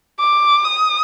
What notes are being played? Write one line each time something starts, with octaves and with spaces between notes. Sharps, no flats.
D6
D#6